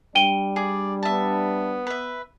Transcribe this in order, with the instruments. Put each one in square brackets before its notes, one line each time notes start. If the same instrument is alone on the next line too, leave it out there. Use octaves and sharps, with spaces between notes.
[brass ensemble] G3 D4 [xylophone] G5 D#7 G7
[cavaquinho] G#4 [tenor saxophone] D5
[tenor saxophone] B3 [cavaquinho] E5 A5
[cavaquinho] B4 E5